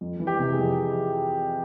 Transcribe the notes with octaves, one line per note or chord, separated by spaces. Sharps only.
F2
E3
G4
C3
G#4
F2